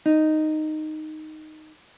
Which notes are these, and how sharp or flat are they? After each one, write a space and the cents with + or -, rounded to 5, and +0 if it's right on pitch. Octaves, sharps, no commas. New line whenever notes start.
D#4 -5